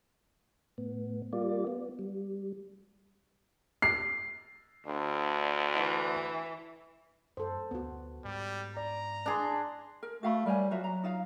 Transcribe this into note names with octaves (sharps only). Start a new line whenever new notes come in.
A2 B3
G3 A#3 F4 D5
B3
G3
C7
D2 D4
E3
F#2 A4 C5
D2 B3 F#4
G#2 G3
D5 A#5
D4 G#4 C6
A#4
A3 F#4 F5 B5
G3 A#4 C#5 G#5
F#3 F4 F#4 E5
A#5
D#4 F4 F5